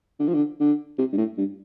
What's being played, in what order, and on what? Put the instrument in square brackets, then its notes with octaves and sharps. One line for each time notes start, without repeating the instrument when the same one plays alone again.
[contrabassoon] D3
F3
D3
D3
C3
G2
A2
G2